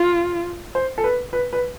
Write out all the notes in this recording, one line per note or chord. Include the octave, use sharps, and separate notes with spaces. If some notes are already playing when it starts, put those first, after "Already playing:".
Already playing: F4
C5
A4
B4
B4
B4